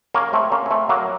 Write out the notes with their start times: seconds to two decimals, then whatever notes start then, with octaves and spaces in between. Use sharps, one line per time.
0.14 A#3 C#4
0.33 A3 C4
0.52 A#3 C#4
0.66 C#4
0.71 A3 C4
0.89 F#3 A#3